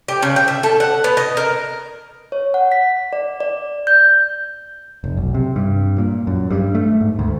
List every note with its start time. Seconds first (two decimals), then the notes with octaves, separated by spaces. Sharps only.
0.08 G4
0.22 C#3
0.36 G5
0.48 E5
0.63 A4
0.80 F#5
1.04 B3
1.17 D#5
1.37 A#4
2.32 C#5
2.54 F#5
2.72 B6
3.13 D5
3.40 D5
3.87 G6
5.04 F1
5.17 B1
5.34 C3
5.56 G2
5.98 A#2
6.27 F#2
6.50 G2
6.75 A3
7.01 G#2
7.19 D2